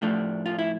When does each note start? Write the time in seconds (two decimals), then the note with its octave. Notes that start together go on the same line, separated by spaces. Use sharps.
0.02 A2 F3 A3 D4
0.46 F4
0.59 E4